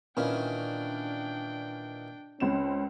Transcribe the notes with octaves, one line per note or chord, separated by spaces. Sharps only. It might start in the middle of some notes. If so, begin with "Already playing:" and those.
A#2 D#3 E3 C#4 D4 G5
C#2 C4 C#4 E7